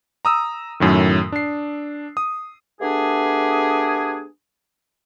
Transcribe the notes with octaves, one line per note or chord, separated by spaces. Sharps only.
A#5 D#6 E6
F#2 A2 D#3
D4 C7
D#6
A3 B3 D4 G4 G#4